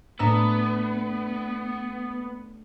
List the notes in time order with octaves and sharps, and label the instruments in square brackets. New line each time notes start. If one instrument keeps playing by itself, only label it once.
[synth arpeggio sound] A2 A#5 E6 [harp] A3 D4 [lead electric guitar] B3